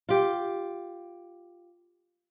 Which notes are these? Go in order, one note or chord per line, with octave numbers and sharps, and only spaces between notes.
F4 G4